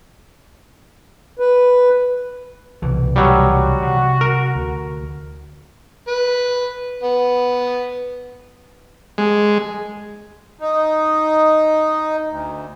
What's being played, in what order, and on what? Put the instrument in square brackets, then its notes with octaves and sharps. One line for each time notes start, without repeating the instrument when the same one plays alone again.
[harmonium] B4
[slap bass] C2 B2 E3
[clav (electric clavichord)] F#3 G3
[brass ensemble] F#4
[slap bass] C3
[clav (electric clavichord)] A#4
[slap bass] D2
[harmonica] B4
B3
[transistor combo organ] G#3
[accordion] D#4
D2